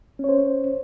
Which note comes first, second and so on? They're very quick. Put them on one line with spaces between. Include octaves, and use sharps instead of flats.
C#4 C#5 C5